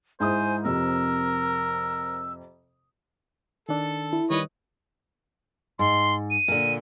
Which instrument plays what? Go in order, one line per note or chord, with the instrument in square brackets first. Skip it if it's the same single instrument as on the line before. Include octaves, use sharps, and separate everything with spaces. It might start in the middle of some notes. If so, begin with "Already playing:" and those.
[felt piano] G#2 E4 D#6 [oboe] C5 [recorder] G#5
[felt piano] F2 C3 [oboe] A#4 [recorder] E6
[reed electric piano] D#3 D4 [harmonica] A4
[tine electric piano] E4
[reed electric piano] D#3 G3 [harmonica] B4 C#5 D#5
[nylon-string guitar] G#2 [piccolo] C6
[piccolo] D#7
[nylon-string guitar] A#2 D3